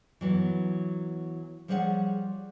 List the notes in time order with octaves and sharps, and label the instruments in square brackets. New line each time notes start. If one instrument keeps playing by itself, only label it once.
[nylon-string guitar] E3 F#3 B3
F3 G3 G#4 C#5 D5 F#5